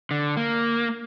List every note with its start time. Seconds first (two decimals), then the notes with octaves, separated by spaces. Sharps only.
0.11 D3
0.37 A#3